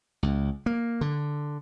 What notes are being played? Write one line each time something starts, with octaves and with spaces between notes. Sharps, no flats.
C#2
A#3
D3